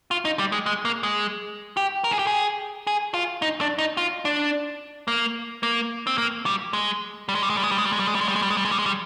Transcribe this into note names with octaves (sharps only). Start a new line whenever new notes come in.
F4
D#4
G3
G#3
G#3
A#3
G#3
G4
A#4
G#4
G4
G#4
G#4
F4
D#4
D4
D#4
F4
D4
A#3
A#3
C4
A#3
G3
G#3
G3
G#3
G3
G#3
G3
G#3
G3
G#3
G3
G#3
G3
G#3
G3
G#3
G3
G#3
G3
G#3
G3
G#3
G3
G#3
G3